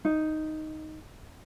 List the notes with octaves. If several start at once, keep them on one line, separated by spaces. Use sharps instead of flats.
D#4